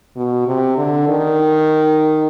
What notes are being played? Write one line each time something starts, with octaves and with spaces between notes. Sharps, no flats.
B2
C3
D3
D#3